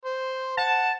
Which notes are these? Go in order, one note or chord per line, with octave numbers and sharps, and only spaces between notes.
C5
F#5 A5